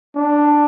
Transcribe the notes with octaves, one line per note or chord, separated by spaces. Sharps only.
D4